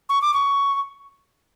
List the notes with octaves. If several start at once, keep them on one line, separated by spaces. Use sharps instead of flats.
C#6
D6
C#6